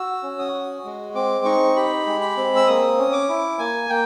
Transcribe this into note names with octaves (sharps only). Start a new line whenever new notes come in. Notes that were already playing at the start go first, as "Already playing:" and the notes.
Already playing: F#4 E6
C#4
D#6
F#4
G#3
C4 D6
D#4 C#6
G4 B5
G#3
B5
C4
E6
A#3 D#6
C#4
D6
E4
A#3 G#5
A#3 G5